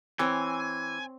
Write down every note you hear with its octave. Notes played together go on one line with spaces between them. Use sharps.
E3 C4 C#5 G#5